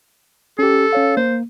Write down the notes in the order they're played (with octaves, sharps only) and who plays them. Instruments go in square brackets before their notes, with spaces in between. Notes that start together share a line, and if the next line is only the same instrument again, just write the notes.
[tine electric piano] C#4 G4 [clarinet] A4
[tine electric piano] C#4 C#5 F5
[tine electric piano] A#3 [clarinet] C5